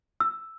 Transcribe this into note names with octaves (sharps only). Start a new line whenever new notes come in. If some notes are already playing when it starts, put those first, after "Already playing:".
E6